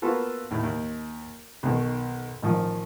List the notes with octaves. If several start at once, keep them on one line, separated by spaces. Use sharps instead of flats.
A#3 B3 F4 F#4 A4 B4
D#2 A2
D#2
B1 B2 D#3
A1 D#3 F3 D#6